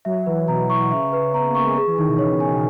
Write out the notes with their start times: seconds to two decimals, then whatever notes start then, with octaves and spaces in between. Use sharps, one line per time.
0.05 F#3 E5
0.26 E3 B4
0.48 B2 A#5
0.70 C#6
0.91 C#3 E5
1.13 B4
1.34 B3 A#5
1.48 A#3
1.55 C#6
1.62 G#3
1.76 G#4
1.87 E3
1.98 D#3 D#4
2.08 B2
2.18 C#3 C#5
2.33 D#3
2.40 G#5
2.47 D#3